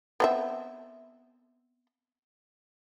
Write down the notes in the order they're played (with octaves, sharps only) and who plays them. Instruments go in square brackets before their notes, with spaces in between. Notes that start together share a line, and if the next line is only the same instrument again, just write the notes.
[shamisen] B3 C4 E5